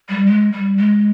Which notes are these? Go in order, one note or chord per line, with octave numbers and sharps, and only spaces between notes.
G3
G#3
G3
G#3